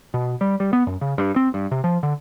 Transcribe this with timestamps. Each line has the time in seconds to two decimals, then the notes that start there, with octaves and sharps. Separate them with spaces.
0.14 B2
0.41 G3
0.60 G3
0.73 B3
0.87 F#2
1.01 C#3
1.18 G2
1.36 C4
1.54 G2
1.71 C3
1.84 F3
2.03 D3